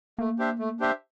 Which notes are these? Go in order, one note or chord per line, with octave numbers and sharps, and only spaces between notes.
A3 A#3
D4 G4 C5 E5
A3
D4 G4 C5 E5